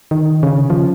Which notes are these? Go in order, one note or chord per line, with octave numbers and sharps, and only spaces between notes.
D#3
C#3
F3